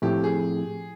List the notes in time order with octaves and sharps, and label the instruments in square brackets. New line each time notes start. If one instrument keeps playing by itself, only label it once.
[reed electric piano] A2 F3 A3 C4 E4 [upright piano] G4
[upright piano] G#4